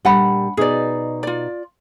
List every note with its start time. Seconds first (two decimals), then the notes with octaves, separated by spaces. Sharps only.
0.05 A#2 G3 D4 F#5 B5
0.57 B2 D#4 G#4 B4 D5
1.23 F4 D5